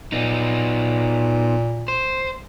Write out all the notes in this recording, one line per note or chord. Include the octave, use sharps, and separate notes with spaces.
A#2 B3 D#4
C5